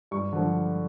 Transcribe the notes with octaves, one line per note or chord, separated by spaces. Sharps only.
G2 C#6
D3 F3